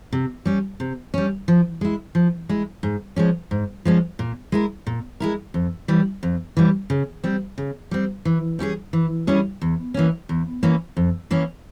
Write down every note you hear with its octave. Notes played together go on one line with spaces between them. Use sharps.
C3
G3 C#4
C3
G3 C#4
F3
G#3 E4
F3
G#3 E4
G#2
F3 G#3 C#4
G#2
F3 G#3 C#4
A#2
G#3 E4 A#4
A#2
G#3 E4 A#4
F2
E3 G3
F2
E3 G3
C#3
G3 C4
C#3
G3 C4
E3
G3 C#4 E4 G#4
E3
G3 C#4 E4 G#4
E2
E3 A#3 C#4
E2
E3 A#3 C#4
F2
E3 A#3 C#4